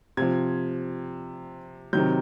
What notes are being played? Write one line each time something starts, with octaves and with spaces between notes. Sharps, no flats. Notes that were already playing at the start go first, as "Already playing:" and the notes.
C3 F3 G#6
C3 D#3 F#3 G6